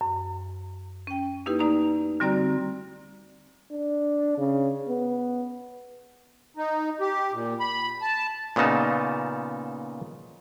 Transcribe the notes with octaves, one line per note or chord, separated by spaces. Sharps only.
F#2
C#4 G5
A#3 D#4 E4 G4 B4
A3 D#4 D5 A#5
D3 G3 C4 F#4 D5 A#5
D4
C#3
B3
D#4
G4
A#2
B5
A5
A#2 C#3 B3 D#4 A5